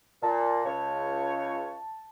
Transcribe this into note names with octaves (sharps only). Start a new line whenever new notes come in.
A#2 A5
C#2 F4 C#5